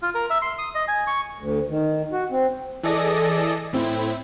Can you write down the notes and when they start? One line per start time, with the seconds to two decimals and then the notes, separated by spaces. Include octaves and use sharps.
0.02 F4
0.15 A#4
0.30 E5
0.42 C6
0.58 D#6
0.75 D#5
0.88 G#5
1.07 C#6
1.38 D2
1.69 D#3
2.12 F#4
2.31 C4
2.83 E3 G#4 A4 D5 D#5 A#6
3.73 A2 C4 E4